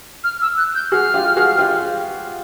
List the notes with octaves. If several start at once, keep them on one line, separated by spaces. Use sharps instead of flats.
F6
E6
F#6
G6
F#4 G#4 F6
F4 G4
F#4 G#4
F4 G4